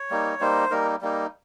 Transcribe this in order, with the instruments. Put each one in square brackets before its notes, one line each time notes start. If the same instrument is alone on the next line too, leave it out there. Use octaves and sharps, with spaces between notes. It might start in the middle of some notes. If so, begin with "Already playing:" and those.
Already playing: [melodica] C#5
G3 A#3 D#4
G3 A#3 D#4 C5
G3 A#3 D#4 A#4
G3 A#3 D#4